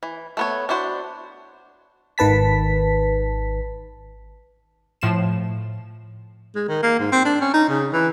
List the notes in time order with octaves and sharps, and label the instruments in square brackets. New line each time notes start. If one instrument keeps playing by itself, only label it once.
[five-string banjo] E3
A3 B3 C#5
D4 E4 F#4 C5
[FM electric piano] G#1 D#3 B4 A5 B6
[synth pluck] A2 F3 C7 E7
[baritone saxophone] G#3
D#3
A#3
G#2
C4
D4
C#4
D#4
C#3
E3